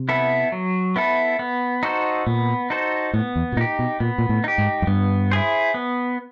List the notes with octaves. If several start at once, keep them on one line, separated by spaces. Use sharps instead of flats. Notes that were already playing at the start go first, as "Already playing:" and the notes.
Already playing: C3
B3 E4 A4
F#3
B3 E4 A4
B3
D#4 F#4 A4 C5
A#2 B3
D#4 F#4 A4 C5
A2 B3
E2
B2
A#2 D#4 G4
B2
A#2 B3
A#2
A2
D#4 G4
G#2
F#2
G2 B3
E4 G#4 C5
B3